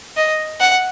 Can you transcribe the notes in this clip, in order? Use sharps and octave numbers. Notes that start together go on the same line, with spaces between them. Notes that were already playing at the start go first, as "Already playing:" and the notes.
D#5
F#5